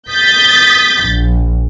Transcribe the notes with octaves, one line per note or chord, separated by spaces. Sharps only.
D#6 G6 A6 B6
A#1